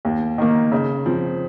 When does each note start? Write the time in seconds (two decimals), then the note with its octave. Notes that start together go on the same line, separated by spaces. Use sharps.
0.05 D#2
0.38 D#3 A#3
0.72 C#3
1.06 F3 C4